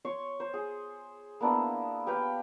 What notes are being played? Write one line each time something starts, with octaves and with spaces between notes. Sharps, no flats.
C#5 C6 C#6
C5
G#4
A#3 B3 D4 E4
G4 B4 F5 G5